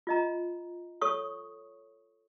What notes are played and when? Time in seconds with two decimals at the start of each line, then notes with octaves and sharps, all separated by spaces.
0.07 F4 D#5 A#5
1.01 A4 C#5 C#6 D#6